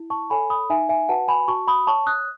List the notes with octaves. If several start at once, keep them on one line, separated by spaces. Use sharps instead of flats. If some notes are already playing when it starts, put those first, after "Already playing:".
Already playing: E4
A5 C#6
A4 C#5 G#5 B5
B5 D#6
D#4 E5 G#5
E5 G#5
F#4 B4 F#5 A5
G#5 B5
F#4 A5 C#6
B5 D#6
C#5 A5 C#6
D#6 F#6